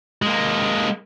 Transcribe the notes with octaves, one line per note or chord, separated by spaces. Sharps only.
G#3 A#3